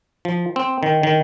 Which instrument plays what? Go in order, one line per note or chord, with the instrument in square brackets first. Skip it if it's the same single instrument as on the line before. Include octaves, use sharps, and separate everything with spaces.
[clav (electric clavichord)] F3
C4
D#3
D#3